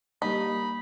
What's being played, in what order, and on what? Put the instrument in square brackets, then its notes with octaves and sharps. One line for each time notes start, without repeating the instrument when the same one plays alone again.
[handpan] G3 A#3 D4 [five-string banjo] D#4 [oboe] B5